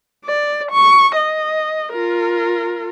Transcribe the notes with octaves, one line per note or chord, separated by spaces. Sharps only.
D5
C#6
D#5
F4 A#4